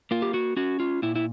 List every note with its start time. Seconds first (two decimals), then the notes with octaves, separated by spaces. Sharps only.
0.11 A#3 F4
0.22 G4
0.34 F#4
0.57 C#4 F#4
0.80 F4
1.02 A#2 E4
1.16 E4